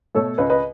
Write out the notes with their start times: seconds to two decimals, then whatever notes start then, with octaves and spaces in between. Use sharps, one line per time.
0.15 B2 A3 A4 C#5
0.38 C#2 B4 D#5
0.50 B4 D#5